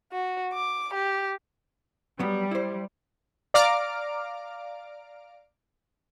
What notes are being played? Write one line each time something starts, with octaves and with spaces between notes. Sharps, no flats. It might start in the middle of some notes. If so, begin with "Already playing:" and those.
F#4
D6
G4
F#3 G3 B3
E4 C5
D5 F5 A#5 D6 F6 D7